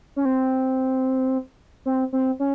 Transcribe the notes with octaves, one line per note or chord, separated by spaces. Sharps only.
C#4
C4
C4
C4
C#4